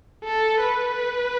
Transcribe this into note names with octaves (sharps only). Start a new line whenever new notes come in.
A4
B4